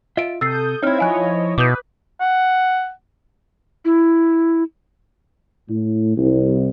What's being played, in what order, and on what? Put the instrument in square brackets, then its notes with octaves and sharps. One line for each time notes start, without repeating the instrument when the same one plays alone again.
[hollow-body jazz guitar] F4 E5 [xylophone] D#5 D7
[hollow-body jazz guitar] C3 [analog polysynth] A4 D#6 G6 [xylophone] E6 A6 C7
[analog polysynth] C4 G#6 [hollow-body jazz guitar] D#4 E4 [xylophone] C#5 F6
[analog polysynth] F3 C#5 D#5 [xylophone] F5 G#5 F#6
[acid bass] B2 [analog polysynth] B4 [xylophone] D6 D#6 G6
[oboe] F#5
[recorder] E4
[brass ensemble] A2
C2